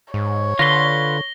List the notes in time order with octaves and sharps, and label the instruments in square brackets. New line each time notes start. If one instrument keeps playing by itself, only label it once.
[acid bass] G#2 [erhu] C#5
[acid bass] D3 [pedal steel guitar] F4 B4 C6 [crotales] A#6 G7